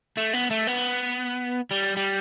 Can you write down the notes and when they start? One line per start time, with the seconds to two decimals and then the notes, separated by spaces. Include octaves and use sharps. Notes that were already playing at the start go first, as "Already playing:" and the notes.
0.17 A3
0.33 B3
0.51 A3
0.67 B3
1.71 G3
1.96 G3